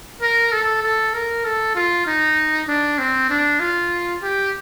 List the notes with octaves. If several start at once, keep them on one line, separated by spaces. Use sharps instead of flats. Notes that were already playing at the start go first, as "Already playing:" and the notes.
A#4
A4
A4
A#4
A4
F4
D#4
D4
C4
D4
F4
G4